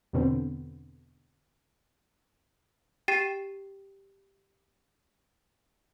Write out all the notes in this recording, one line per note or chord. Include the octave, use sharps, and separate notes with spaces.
E2 B2 D3 C4
G4 G5 A6 C7 E7